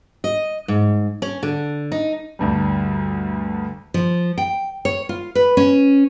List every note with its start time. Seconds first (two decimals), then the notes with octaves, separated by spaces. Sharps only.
0.24 D#5
0.68 G#2
1.22 C#4
1.43 D3
1.92 D#4
2.39 D2 G2 G3
3.94 F3
4.38 G5
4.85 C#5
5.09 F4
5.35 B4
5.57 C#4